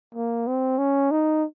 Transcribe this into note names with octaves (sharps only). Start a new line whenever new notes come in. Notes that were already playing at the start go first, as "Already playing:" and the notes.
A#3
C4
C#4
D#4